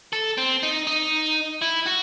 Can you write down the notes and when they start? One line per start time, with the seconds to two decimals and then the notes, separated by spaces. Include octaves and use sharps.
0.13 A4
0.38 C4
0.63 D#4
0.87 D#4
1.62 E4
1.86 F#4